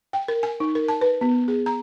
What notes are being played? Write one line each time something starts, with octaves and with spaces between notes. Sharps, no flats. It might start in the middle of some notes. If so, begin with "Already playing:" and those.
G5
A#4
G#5
D#4
A#4
A5
B4
B3
G#4
A#5